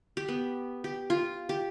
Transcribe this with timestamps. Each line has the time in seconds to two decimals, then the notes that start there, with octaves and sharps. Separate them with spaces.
0.17 G4
0.28 B3
0.84 G4
1.10 F4
1.49 G4